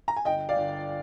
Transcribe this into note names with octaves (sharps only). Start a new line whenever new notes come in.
A#5
G#5
G1 D#5 G5
D5 F5
G1